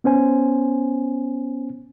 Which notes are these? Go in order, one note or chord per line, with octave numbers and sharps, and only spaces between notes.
B3 C#4 C5 G#5